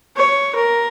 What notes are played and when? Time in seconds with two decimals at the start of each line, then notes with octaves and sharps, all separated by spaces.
0.16 C#5
0.55 A#4